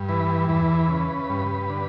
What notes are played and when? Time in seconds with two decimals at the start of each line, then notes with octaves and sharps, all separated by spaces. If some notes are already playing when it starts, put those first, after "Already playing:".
Already playing: G2
0.09 E3 B4
0.49 E2 B4
0.89 C#3
1.30 G2
1.70 D3